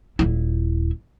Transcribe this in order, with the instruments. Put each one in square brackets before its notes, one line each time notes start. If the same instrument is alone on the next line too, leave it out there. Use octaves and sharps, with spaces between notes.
[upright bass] D#1 E4